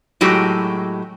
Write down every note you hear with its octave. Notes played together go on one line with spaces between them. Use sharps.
A2 F#3 G#3 F#4 G4